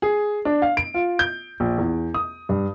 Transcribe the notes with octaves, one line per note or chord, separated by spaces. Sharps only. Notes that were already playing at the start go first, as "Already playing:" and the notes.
G#4
D4
F5
D7
F4
G6
A#1
E2
D#6
G2